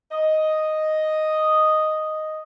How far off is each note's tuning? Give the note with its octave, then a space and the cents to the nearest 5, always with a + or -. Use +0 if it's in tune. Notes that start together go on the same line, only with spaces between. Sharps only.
D#5 +0